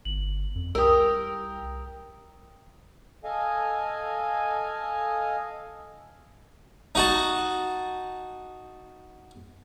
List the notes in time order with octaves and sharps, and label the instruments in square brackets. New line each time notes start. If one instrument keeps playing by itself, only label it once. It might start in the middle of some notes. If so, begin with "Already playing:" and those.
[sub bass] G1 [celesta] F#7
[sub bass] F2
[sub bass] C2 [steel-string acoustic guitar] G4 A#4 [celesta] D#6 E6
[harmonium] A4 D#5 F5 G#5
[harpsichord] D#4 F#4 A5